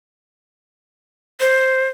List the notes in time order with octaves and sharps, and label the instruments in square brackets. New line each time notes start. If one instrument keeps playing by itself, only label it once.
[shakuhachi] C5